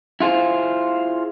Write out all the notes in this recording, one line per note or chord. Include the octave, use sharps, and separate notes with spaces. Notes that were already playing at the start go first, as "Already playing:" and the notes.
E4 F4 G#4 C5